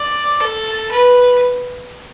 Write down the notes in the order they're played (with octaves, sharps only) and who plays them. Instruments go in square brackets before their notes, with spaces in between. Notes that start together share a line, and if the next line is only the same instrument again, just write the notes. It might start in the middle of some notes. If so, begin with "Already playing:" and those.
Already playing: [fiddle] D5
A4
B4